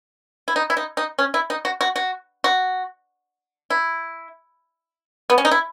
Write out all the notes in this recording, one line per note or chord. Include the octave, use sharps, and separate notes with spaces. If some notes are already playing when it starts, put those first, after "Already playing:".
E4
D#4
E4
D#4
D#4
C#4
E4
D#4
F#4
F#4
F#4
F#4
E4
B3
C#4
D#4
E4